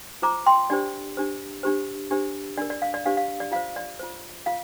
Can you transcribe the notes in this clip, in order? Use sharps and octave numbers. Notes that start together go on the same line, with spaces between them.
F4 C5 A#5 D6
G5 C6
D4 G4 C5 D5
D4 G4 C5
D4 G4 C5
D4 G4 C5
D4 A#4 D5
D5
F5
D5
D4 G4 C5 F5
F5
D5
F4 C5 F5
D5
F4 C5
F4 F5